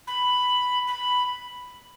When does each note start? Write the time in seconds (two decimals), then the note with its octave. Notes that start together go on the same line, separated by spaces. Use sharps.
0.07 B5
0.87 B5